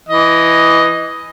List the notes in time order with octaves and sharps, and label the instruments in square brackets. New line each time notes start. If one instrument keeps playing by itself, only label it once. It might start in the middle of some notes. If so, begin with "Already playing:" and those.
[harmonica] E3 D#5